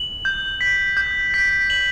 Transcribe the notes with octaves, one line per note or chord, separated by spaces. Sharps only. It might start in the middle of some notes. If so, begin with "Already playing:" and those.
Already playing: F#7
G6
B6
G6
B6
F#7